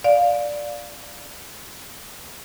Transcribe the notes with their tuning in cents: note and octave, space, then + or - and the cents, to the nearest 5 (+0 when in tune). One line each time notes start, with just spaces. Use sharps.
D5 +0 F5 +10